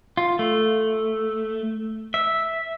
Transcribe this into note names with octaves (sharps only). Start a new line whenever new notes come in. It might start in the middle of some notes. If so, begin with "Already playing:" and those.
F4
A3
E5